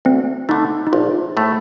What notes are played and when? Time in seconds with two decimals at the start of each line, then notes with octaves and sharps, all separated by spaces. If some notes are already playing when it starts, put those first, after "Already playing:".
0.05 D2 C4
0.49 D3 A3 D#4
0.87 D#4
0.93 A#1 F4
1.37 A2 A3